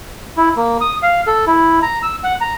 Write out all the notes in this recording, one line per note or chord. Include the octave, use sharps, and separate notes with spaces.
E4
A#3
D#6
F5
A4
E4
A#5
E6
F#5
A#5